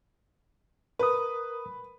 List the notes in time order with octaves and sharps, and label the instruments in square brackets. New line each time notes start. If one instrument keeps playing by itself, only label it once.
[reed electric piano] A#4 D#6 [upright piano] B4